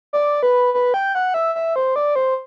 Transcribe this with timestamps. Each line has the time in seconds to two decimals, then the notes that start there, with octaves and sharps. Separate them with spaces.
0.13 D5
0.43 B4
0.74 B4
0.94 G5
1.15 F#5
1.34 E5
1.55 E5
1.76 C5
1.96 D5
2.16 C5